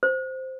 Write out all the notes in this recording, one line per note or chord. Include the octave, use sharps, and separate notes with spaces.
C5